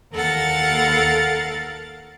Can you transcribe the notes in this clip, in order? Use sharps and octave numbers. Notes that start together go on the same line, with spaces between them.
D#2 A4 A#4 F5 F#5 A6